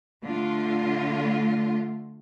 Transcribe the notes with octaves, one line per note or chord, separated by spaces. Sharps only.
D3 A3 F4